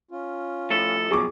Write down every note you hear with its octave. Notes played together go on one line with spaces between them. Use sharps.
C#4 F4
A2 F3 A3 A4
B2 F3 F#3 G#4 C#6 D6